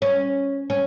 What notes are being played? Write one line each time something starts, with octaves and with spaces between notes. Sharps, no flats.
C#4
C#4